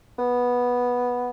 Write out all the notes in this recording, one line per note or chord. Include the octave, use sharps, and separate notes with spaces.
B3